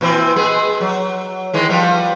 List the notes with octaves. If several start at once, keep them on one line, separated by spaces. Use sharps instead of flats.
A#2 E3 C4
G#3 B3 G#4
F#3
D#3 E3 G#3
F3 G3 B3